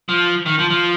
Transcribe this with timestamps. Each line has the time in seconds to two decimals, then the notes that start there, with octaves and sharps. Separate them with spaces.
0.09 F3
0.46 D#3
0.59 F3
0.70 F3